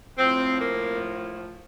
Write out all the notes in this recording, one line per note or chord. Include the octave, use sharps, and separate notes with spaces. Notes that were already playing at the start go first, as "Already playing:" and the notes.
A2 F3 C4
A#3